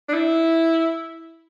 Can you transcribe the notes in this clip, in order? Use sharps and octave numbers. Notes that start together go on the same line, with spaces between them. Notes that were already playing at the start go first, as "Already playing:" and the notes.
D4
E4